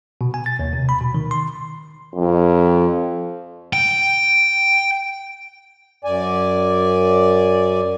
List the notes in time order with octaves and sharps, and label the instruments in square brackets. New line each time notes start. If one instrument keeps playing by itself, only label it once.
[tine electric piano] B2
G#5
A6
D#2
C3
B5
B2
D#3
C6
[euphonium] F2
[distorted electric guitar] G5
[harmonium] F#2 D5 G#5